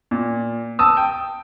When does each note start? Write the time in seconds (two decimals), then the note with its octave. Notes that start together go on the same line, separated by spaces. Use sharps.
0.11 A#2
0.79 A5 D#6 E6
0.97 G5